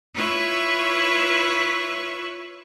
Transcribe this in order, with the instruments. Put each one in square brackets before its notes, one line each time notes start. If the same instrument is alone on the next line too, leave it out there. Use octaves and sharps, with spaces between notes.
[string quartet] E4 F4 B4 C#5 E5 C#6